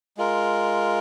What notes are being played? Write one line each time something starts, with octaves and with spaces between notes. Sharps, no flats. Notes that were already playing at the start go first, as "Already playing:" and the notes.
G#3 F4 A#4